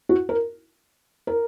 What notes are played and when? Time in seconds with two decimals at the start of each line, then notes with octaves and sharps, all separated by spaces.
0.09 F#4
0.29 A#4
1.27 A#4